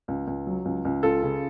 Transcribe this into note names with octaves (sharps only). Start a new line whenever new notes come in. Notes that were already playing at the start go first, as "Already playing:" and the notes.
C#2
C#2
F#3
C#2
C#2
C#2 F4 A4
C#3